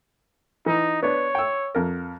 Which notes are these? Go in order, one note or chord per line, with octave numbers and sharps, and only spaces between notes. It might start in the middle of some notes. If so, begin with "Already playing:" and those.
E3 D#4
B3 D4 C#5
G5 E6
F2 A#4